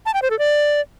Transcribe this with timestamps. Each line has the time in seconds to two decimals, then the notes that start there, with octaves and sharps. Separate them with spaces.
0.06 A5
0.14 G5
0.22 C5
0.31 A4
0.39 D5